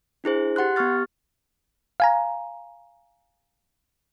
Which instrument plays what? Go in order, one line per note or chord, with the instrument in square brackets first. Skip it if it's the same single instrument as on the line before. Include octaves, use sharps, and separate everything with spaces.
[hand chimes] D4 E4 G#4 C5
G4 F#5 C6 F#6
B3 G4 C#6 F6 A6
[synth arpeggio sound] F5 G#5 A#5